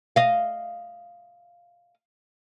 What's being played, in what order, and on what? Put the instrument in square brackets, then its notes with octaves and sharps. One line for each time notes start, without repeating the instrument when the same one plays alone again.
[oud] D#5 F5